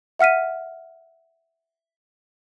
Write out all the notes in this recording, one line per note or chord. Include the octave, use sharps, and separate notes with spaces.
E5 F#5 F6 B6 D#7